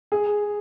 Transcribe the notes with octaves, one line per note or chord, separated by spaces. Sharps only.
G#4